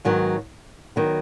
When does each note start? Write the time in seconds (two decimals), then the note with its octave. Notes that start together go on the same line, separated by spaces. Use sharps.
0.05 G#2 D#3 F#3 B3
0.96 D#3 F#3 B3